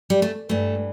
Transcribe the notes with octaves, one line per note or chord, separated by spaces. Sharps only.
G3
A3
G2 E3 A3